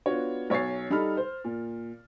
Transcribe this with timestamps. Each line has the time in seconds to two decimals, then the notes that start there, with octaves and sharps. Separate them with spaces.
0.06 B3 D4 F4 F#4 C#5
0.50 B1 C#5 C#6 A6 C7
0.90 G3 D#4 A4 B5 F6
1.17 C5
1.44 A#2